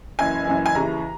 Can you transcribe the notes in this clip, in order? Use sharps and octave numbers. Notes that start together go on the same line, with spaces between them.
F#1 F#2 E3 G#5
F#1 F#2 E3
G#5
D#2 C#3 E3 A#5